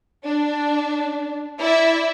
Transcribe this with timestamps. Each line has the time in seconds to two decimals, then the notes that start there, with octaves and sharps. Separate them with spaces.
0.25 D4
1.58 E4 D5 E5